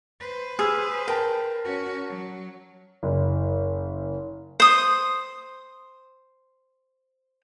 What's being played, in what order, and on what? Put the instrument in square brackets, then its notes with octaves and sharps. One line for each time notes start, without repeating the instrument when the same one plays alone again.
[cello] B4 C5
[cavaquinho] G#4 [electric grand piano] E6 F6
[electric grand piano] A#4 A5 [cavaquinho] G5
[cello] C#4 F#4
F#3
[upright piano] F#1
[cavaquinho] C5 D#6